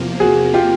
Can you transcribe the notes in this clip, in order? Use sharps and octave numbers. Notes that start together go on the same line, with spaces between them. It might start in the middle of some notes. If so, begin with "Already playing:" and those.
Already playing: E2 C3 F3 A#3
F#4 G#4
F4 G4